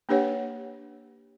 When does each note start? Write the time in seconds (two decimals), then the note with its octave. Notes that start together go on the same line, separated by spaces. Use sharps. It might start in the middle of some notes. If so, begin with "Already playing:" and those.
0.09 A#3 D4 G4 B4 C#5 F#5